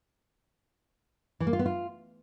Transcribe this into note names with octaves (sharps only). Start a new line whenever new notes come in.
E3
A#3
F4
B3
F4